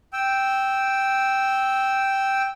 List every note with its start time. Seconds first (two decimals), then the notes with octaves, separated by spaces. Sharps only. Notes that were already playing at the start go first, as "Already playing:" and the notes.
0.13 G5 E6